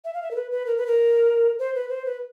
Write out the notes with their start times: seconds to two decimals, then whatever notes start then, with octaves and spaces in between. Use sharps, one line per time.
0.05 E5
0.14 F5
0.22 E5
0.31 A#4
0.36 B4
0.51 B4
0.66 A#4
0.77 B4
0.87 A#4
1.59 C5
1.75 B4
1.89 C5
2.06 B4